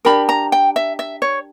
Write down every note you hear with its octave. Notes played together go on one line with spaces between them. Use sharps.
D4 G4 A#4 B5
A#5
G5
E5
E5
C#5